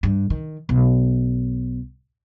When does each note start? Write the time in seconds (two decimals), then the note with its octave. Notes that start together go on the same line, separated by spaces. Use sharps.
0.03 G2
0.30 D#3
0.69 B1